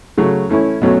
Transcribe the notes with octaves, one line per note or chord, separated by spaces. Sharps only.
C#3 F#3 A3
E3 A3 C#4 E4
B2 F#3 A3 C#4